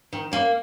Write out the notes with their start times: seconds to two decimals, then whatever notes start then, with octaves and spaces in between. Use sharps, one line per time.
0.13 D#3
0.32 F#2 A#3